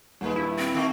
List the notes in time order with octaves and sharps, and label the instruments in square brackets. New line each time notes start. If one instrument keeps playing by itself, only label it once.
[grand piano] D#1 A#3 B4 [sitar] G2 G#3
[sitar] G2 [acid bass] E4
[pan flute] C4
[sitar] D#3 A3 A#3